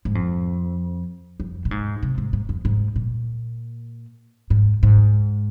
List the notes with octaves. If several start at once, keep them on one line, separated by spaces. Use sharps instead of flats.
G#2
F2
F2
A#2
G#2
C3
G#2
G#2
F2
G#2
A#2
G#2
G#2